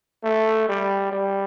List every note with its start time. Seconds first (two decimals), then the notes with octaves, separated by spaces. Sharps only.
0.24 A3
0.69 G3
1.12 G3